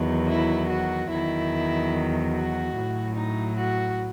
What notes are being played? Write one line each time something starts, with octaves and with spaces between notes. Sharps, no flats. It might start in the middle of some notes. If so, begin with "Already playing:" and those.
Already playing: E2 D#3 F#3
E4
F#4
E2 D#3 F#3 E4
F#4
A2 F#3
D#4
F#4